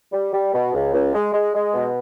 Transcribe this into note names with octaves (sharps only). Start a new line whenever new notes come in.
G3
G3
B2
C#2
C#2
G#3
G#3
G#3
B2